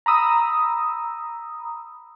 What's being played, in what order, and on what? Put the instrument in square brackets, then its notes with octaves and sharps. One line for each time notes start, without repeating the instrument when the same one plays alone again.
[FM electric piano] A#5 B5 D#6 E6